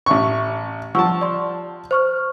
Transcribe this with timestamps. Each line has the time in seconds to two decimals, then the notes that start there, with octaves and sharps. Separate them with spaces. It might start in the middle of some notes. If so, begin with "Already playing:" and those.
0.06 A1 E5 C#6
0.95 F3 G3 F#5 A5 C#6 E6
1.21 D5 C6
1.91 C5 C#6 F6